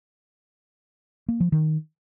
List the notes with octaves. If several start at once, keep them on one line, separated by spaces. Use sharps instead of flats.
A#3
F3
D#3